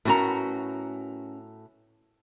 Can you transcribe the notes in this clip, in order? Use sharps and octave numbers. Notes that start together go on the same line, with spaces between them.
A2 B3 C#4 F#4 A#4 A#5